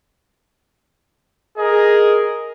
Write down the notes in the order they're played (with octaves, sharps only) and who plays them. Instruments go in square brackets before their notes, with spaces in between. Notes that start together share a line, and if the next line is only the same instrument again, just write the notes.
[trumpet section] G#4 A#4 D#5